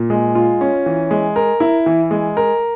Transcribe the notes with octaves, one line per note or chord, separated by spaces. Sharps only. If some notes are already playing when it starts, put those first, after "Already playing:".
Already playing: A#2
G#3
F4
C#4
E3
G#3
A#4
E4
E3
G#3
A#4